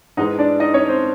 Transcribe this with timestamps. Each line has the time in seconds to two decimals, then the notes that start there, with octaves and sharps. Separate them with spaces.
0.17 G#2 E3 G#3 D#4 D#5
0.39 D4 D5
0.60 D#4 D#5
0.74 C#4 C#5
0.88 C4 C5